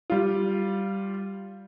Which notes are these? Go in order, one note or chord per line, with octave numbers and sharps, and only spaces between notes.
G3 F4